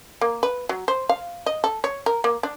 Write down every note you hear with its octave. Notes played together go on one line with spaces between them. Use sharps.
A#3
B4
F#3
C5
F5
D#5
A4
C#5
A#4
A#3
D4